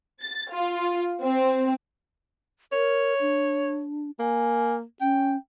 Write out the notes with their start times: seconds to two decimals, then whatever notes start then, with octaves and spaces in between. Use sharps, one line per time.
0.21 A6
0.53 F4
1.20 C4
2.72 A#4 C#5
3.21 D4
4.19 A#3 G#5
5.01 C#4 G5